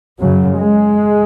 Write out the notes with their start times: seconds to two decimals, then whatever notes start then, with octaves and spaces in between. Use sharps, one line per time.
0.20 F#2 C#3 F#3
0.58 G#3